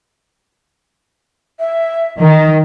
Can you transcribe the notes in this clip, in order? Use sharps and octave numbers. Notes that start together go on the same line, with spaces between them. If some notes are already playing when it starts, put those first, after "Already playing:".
E5
D#3 D#5